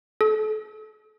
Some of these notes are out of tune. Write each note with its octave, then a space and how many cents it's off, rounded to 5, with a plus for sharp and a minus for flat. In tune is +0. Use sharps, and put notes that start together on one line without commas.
A4 -35